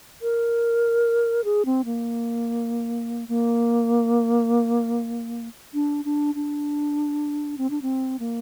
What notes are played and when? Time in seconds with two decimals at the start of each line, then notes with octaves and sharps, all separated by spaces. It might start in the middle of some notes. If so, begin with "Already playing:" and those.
0.22 A#4
1.44 G#4
1.66 C4
1.85 A#3
3.28 A#3
5.74 D4
6.05 D4
6.35 D4
7.58 C4
7.70 D4
7.82 C4
8.19 A#3